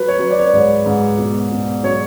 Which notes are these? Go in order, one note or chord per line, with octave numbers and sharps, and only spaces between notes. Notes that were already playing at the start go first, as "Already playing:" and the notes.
Already playing: F#3 B4
C#5
F#3
D5
C#5
D5
G#2
G#2
B2
B2
F#3 C#5